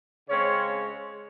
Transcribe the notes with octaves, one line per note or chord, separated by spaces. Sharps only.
C#3 G#3 C4 C#4 C#5